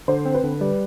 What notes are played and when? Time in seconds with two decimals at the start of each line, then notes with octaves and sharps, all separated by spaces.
0.08 D3 C5
0.25 C4
0.34 B4
0.43 D3
0.61 G3